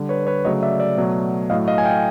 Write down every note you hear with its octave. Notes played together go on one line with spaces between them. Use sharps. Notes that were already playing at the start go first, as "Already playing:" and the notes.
Already playing: D3 G3
B4 C#5
B4 C#5
C#3 F#3 A3 C#5 D#5
D5 E5
D5 E5
B2 F#3 A3
A2 F#3 A3 D#5 F5
D#5 F5
G#5
F5 G5